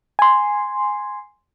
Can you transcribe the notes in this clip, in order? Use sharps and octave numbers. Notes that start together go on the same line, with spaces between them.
G#5 C6